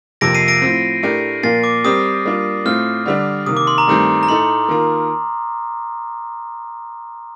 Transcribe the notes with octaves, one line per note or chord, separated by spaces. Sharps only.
F2 C3 F3 A#3 F4 A#6 D7
C7 D#7
A#6 D7
A2 F3 C4
A2 A3 D4 G4 A#4
A#2 F3 A#3 F4 A#4 A6 C7
D6
G3 C4 G4 A#4 D#6
G3 A#3 D4 F4
A2 A3 C4 F4 F6
D3 G3 D4
C3 D#3 A#3 D#6
D6
C6
A#5
G2 D#3 A3 C4 G4
A#5
A2 A3 D#4 A4 C6
D#3 A#3 F4 A#4